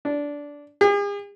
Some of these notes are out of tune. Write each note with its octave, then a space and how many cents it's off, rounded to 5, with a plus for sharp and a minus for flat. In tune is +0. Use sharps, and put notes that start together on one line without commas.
D4 -15
G#4 -45